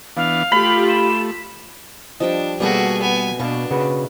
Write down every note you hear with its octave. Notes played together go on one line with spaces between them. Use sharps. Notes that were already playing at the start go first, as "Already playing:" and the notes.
E3 B3 D4 F5
A3 F4 G4 B5
E7
F3 G3 D4 D#5 G5
B2 G3 A#3 F#4 G#4 A4 D5
B3 G#5
B2 D4 F5 C#6
C#3 F#4 B4